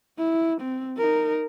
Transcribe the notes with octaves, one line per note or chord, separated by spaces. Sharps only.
E4
C4
D#4 A#4